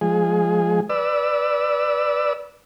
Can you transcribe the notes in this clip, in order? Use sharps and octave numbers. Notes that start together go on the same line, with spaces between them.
F3 G#3 G#4
B4 D5 E6